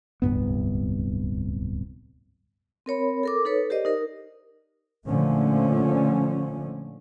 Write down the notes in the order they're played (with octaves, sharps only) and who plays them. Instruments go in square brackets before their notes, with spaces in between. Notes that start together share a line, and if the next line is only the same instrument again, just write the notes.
[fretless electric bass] D1 C2 G2 B3
[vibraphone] C4 A#4 C#5 B5
A4 A#4 D6
D#4 A4 B4 C#5
G4 A#4 C5 D5 D#5
D#4 A#4
[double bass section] A#2 D3 F3 A3 C#4